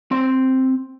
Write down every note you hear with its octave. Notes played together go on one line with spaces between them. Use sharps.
C4 C6